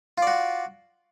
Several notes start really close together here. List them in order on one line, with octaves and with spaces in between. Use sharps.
F4 D5 F#4